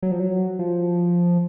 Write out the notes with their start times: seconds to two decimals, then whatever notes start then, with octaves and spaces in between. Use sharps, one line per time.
0.03 F#3
0.11 F3
0.20 F#3
0.59 F3